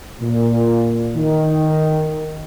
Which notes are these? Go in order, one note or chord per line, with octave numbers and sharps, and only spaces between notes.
A#2
D#3